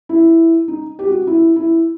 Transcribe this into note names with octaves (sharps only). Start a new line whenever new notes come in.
E4
D#4
G4
F#4
E4
E4